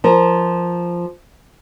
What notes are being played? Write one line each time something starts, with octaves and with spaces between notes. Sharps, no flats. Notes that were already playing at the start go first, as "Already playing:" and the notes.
F3 A#4